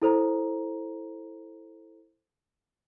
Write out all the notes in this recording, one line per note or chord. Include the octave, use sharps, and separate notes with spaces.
E4 A4 C5 A#5